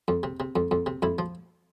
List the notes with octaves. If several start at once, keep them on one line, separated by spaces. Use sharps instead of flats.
F2
C3
C3
F2
F2
C3
F2 E4
F3